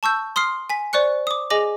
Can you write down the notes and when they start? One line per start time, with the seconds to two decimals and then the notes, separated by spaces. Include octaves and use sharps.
0.03 A5 C#6 E6 G6
0.36 C6 D#6 F6 C7
0.70 G#5 B6
0.93 C5 D5 C#6 F#6 C#7
1.27 D6 D#6
1.50 G#4 D#5 G#5 D6 A#6 F#7